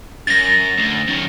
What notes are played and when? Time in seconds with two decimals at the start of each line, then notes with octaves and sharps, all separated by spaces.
0.27 F#2 A6 A#6
0.78 D2
1.08 F#2 D#3